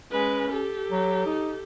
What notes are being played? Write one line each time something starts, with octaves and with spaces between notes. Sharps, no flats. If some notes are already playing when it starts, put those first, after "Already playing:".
G#3 C#4 B4
G4 A4
F#3
D#4